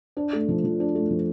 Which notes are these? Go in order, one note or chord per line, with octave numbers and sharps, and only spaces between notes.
D4
A3
F3
F3
D4
A3
F3